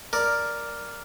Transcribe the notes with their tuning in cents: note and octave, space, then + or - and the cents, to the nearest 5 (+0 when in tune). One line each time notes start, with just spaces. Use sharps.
A#4 +0 D5 +0